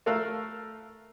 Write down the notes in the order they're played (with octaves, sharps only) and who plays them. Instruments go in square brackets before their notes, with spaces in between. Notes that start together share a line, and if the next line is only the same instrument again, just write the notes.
[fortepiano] A3 A4 A#4 F5 E6 F#6